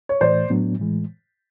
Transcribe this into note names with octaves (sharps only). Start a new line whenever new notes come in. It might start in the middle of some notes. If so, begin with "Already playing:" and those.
C#5
A2 E3 A3 C5 D5
A2 F#3 B3 D4
A2 E3 G#3